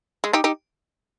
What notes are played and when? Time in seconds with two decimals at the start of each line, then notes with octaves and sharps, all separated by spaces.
0.24 G#3
0.33 D#4 G4
0.44 D#4 G4